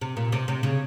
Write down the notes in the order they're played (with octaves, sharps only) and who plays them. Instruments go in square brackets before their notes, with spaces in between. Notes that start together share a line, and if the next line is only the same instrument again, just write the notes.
[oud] C3
A#2
C3
C3
C#3